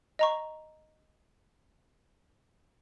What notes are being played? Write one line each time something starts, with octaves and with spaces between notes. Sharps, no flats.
D#5 A#5 C#6